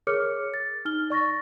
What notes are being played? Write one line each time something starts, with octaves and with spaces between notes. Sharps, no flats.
G#4 A#4 C#5 D6 F6 C#7
A6
D#4 F6 G7
D5 C#6 A6 A#6